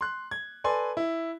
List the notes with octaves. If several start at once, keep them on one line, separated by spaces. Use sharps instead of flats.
C6 F#6
G#6
A4 B4 D5 G#5 C6
E4